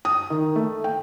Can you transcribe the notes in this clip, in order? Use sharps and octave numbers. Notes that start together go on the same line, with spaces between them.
D#6
D#3
A3
G5